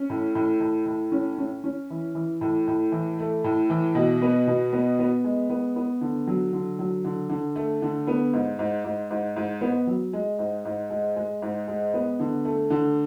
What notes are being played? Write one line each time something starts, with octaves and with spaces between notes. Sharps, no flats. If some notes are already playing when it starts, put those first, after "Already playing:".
Already playing: C#4
A2
A2
A2
A2
C#4
C#4
C#4
E3
E3
A2
A2
E3
A3
A2
E3
B2
B3
B2
B3
B3
G#3
B3
B3
D3
F#3
D3
F#3
D3
D3
A3
D3
B3
G#2
G#2
G#2
G#2
G#2
B3
F#3
G#3
G#2
G#2
G#3
G#3
G#2
G#3
B3
D3
A3
D3